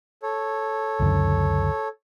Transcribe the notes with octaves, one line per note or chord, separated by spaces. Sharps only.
A4 C#5
C#2 F#2 D3